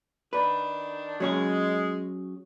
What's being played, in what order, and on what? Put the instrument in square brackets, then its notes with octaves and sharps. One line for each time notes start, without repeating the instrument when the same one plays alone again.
[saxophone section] D#3 D4 [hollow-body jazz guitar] B4
[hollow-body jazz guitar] F#3 C#4 G#4 [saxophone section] G#3